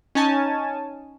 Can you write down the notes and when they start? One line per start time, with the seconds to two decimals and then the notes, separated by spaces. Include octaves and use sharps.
0.15 C#4 D#4 G#5 A5